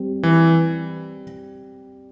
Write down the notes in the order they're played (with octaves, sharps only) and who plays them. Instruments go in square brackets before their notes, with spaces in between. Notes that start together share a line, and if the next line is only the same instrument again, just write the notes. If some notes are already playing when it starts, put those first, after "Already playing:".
Already playing: [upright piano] G3 C4
[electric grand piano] E3